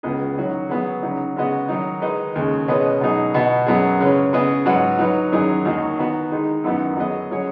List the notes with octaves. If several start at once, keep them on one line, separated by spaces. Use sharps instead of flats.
C#2 C#3 B3 G#4 D#5
D#3 F#3 C#4 F#4
F#3 B3 G#4
C#3 F#3 D#4
C#3 G#3 B3 F#4 D#5
D#3 F#3 D#4
D#3 G#3 D#4 B4 D#5
D#2 C#3 G#3
B2 G#3 C#4 B4 D#5
B2 F#3 D#4 G#4
B2 B3 F#4
F#2 F#3 B3 G#4
C#3 G#3 C#4 B4
C#3 B3 G#4 B4 D#5
G#2 F#3 D#4 F#4 B4
F#3 D#4 F#4 B4
F#2 D#3 F#3 D#4 G#4
D#2 D#3 F#3 D#4 F#4
D#3 B3 F#4
D#3 G#3 D#4
F#2 D#3 B3 D#4 F#4
F#3 B3 G#4 B4 D#5
F#3 C#4 G#4 C#5